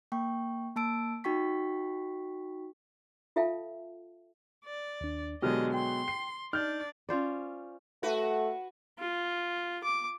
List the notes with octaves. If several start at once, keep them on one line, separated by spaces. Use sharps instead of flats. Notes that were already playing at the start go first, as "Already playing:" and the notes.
A#3 G5 C#6
A#3 A5 E6 D7
D#4 F#4 G5 C#6 B6
F4 A4 E5 F5 G5 A5
D5
D#2 D4
B2 D3 F#3 G#3 G4 D#5 F6
G5 C6
C7
D4 D#4 D5 F6 G6
C#4 F4 C5 D5
A3 F#4 B4
F4
D6